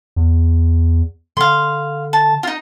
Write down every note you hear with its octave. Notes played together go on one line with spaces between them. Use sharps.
E2
D3 F5 C6
A5
D#4 F4